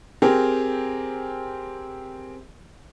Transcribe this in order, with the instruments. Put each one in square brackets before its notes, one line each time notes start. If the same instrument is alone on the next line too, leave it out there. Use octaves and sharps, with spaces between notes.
[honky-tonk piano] C4 G4 G#4 A#4